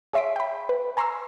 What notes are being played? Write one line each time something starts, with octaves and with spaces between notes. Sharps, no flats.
G#4 C#5 E5 C6 B6 D7
G5 B5
B4
G#5 A#5 C6 C#6 E6 F6